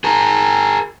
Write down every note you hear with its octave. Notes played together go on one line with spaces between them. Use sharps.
G#4 A#4